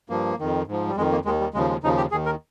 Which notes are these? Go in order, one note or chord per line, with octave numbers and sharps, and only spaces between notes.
G2 F3 A#3
F2 D#3
G#2 F3
G3
F2 D#3 G#3
A#3
D#2 D#3 G#3
G3
D#2 C#3 F3 G#3
G#3
D#2 C#3 F3 D#4
G4
D#2 D#3 G#4
A#4